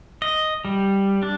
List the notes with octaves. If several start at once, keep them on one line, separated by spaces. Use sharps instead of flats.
D#5
G3
D4